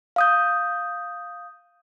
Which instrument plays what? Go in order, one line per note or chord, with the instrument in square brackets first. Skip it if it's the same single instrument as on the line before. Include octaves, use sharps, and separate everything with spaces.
[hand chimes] F5 D#6 G6